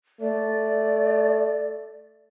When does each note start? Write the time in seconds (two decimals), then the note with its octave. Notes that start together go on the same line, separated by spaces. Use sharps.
0.21 A3 D5